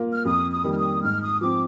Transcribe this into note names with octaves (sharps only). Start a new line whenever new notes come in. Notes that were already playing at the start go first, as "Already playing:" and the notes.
Already playing: A#3 F4
F6
F2 D#6
D#6
D#3 G3 A#3
F6
D#6
G#2 F6
D#6
F3 C4 D6